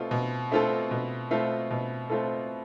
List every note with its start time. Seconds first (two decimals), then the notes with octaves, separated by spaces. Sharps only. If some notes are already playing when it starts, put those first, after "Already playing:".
Already playing: B2 A3 C4 F4 A4
0.11 B2
0.51 A3 C4 F4 A4
0.91 B2
1.31 A3 C4 F4 A4
1.71 B2
2.10 A3 C4 F4 A4